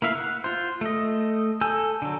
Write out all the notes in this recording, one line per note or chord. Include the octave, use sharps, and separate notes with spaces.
A#3 E4 E5 F5
F#5
F4 C5
A3 D#5
A4 G#5 E6 G6
D3 F#3